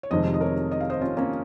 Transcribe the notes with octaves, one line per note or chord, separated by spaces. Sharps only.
C#5
F1 F2 C3 D#3 G#3 C5 D#5
D#5
A#4 C#5
D#5
F5
C5 D#5
C#4 F4
A#3 C#4